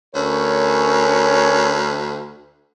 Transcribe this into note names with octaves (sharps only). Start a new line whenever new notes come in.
D2 C#4 A#4 C#5